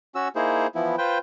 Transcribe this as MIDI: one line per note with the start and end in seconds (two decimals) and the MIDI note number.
0.15 0.28 61
0.15 0.28 66
0.15 0.28 88
0.36 0.67 58
0.36 0.67 63
0.36 0.67 64
0.36 0.67 68
0.36 0.67 72
0.75 0.96 52
0.75 0.96 53
0.75 0.96 59
0.75 0.96 64
0.98 1.18 65
0.98 1.18 71
0.98 1.18 72
0.98 1.18 79